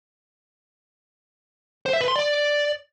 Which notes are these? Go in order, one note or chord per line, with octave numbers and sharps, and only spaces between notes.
C5
E5
B4
C6
D5